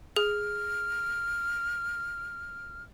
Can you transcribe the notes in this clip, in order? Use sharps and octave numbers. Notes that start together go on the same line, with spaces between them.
G#4 F6